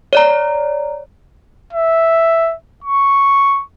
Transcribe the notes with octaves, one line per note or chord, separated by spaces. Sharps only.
C#5 D5 A#5
E5
C#6